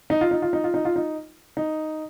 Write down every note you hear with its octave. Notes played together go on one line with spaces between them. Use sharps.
D#4
F4
D#4
F4
D#4
F4
D#4
F4
D#4
D#4